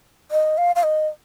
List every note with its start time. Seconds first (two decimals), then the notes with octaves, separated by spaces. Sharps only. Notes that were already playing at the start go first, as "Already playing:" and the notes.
0.31 D#5
0.58 F5
0.76 F5
0.83 D#5